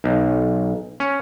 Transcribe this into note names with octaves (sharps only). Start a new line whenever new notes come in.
B1
C#4